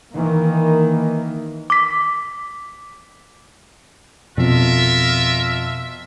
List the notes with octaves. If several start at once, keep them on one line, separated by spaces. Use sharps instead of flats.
D#3 E3 A#3
D6 B6
F2 B2 F4 A#4 E5